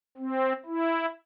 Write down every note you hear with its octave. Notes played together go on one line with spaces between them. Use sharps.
C4
E4